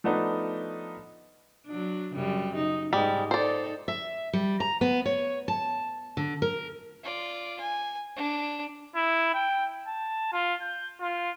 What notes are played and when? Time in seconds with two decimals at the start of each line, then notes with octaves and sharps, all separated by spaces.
0.04 F3 A3 B3 D4 D#4
1.66 F#3 D4
2.13 F#2 C#3 G3
2.55 D#4
2.93 G#2 G3 G#3
3.31 D#4 A4 C5 D5
3.88 E5
4.33 G3
4.60 A#5
4.81 B3
5.05 C#5
5.48 A5
6.17 D3
6.42 A#4
7.04 F4 D5
7.60 G#5
8.16 D4
8.96 E4
9.34 G5
9.87 A5
10.33 F4
10.61 G6
11.01 F4